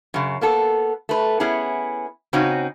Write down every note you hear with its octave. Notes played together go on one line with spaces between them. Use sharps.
F#2 C#3
A#3 B3 A4
A3 B4
B3 C#4 E4 G#4
C#3 C4 C#4 D#4 F#4